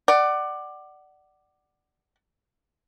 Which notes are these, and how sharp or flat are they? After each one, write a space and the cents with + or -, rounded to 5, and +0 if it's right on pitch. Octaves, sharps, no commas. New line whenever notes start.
D5 +15 F#5 +25